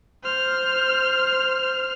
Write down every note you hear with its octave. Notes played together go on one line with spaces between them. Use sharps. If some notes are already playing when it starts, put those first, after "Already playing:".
C5 F6